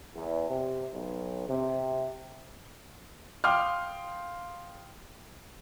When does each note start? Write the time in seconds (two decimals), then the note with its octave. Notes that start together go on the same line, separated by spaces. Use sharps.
0.16 E2
0.50 C3
0.94 B1
1.49 C3
3.44 F5 G5 C6 D6 D#6 F6